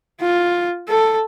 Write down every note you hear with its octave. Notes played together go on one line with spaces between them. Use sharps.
F4
A4